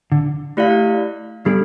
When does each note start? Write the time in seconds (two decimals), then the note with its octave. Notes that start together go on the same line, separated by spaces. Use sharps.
0.12 D3
0.57 A3 E4 G4 D5 F5
1.45 G3 B3 D4 A4